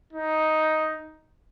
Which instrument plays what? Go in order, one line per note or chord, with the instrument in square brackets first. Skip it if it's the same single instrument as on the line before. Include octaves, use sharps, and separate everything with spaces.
[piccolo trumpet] D#4